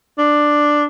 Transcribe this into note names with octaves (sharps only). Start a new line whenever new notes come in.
D4